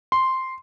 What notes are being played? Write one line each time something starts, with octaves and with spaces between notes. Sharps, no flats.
C6